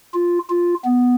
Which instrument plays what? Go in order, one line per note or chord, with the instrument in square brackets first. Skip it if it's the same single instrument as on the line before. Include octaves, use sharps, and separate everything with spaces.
[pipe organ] F4
F4
B3